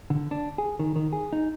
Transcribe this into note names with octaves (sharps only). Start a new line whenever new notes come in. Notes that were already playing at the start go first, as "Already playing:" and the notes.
D3
D4
G#4
D#3
D#3
G#4
D#4